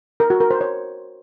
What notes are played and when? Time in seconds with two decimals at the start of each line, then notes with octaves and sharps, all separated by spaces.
0.20 A#4
0.30 F#4
0.40 A#4
0.51 C5
0.61 C#5